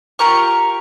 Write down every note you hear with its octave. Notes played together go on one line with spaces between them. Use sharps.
F4 G4 A#4 C#6